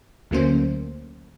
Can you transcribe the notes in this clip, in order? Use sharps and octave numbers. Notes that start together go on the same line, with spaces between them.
D2 F#3 A3 A#3 C#4 C5